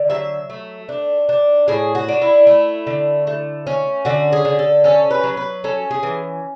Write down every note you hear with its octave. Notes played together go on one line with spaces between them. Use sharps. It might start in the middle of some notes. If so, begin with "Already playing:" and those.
Already playing: D3
F#3 E5
A3
D4
D4
A2 G#4
F#4
D4
E4
A3
D3
A3
C#4
D3 F#4
G#4
D3
A4
C#4 A4
B4
F#3
B4
C#4 A4
G#4
E3